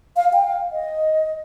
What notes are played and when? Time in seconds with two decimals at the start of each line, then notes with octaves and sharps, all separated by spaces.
0.16 F5
0.33 G5
0.44 F5
0.72 D#5